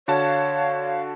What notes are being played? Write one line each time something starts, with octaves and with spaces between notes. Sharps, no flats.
D3 F#4 C#5 F5 A5